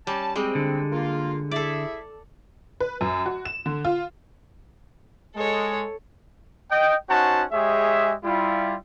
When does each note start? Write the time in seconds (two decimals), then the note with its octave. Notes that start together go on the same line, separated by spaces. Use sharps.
0.07 G3 C#4 A5
0.36 G3 G#3 C4
0.55 D3
0.92 A#3 F4
1.51 E4 G#4 A4 D5 E5
2.80 B4
3.01 F#2
3.26 F#4
3.45 E7
3.66 D3
3.85 F4
5.36 G#3 A4 C#5
6.71 D#5 G5
7.08 C#4 D#4 F#4 C5 F#5 A5
7.52 G#3 G4 G#4 C#5 E5
8.24 G3 E4 F4